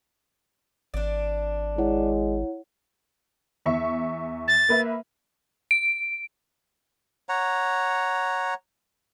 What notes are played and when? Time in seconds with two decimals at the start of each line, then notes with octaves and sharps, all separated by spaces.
0.94 G#1 D4 D5
1.78 G#3 E4 C#5 F#5
3.66 E2 E5 C#6
4.48 A6
4.69 A#3 B4 E5
5.71 D7
7.29 C#5 F#5 A#5